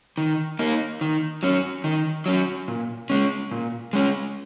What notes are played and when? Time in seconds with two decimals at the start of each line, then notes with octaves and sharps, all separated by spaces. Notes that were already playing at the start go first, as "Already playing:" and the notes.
0.18 D#3
0.59 A#3 D#4
1.01 D#3
1.43 F#3 C#4
1.84 D#3
2.26 F#3 C#4
2.68 A#2
3.10 G#3 C#4
3.51 A#2
3.93 G#3 C#4